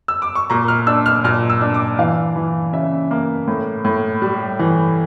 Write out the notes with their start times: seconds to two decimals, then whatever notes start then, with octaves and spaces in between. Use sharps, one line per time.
0.08 E6
0.22 D6
0.35 C#6
0.50 A#2 A#5
0.68 F6
0.87 D4 E6
1.06 F6
1.24 A#2 F6
1.50 E6
1.61 D4
1.74 D6
1.99 E3 F5
2.36 E3
2.73 C#3 E5
3.11 A#3
3.47 A2
3.85 A2
4.22 G3
4.59 E3